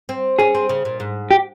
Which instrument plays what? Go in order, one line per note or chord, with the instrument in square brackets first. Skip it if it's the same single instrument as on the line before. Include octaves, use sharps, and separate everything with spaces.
[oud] C4
[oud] C#4 [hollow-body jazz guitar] G#4
[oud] C4
C#3
A#2
G#2
[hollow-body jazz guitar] G4